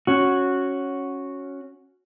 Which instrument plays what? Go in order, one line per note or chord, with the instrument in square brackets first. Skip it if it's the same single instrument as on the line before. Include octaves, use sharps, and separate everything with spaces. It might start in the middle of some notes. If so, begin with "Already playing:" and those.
[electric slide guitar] C#4 F#4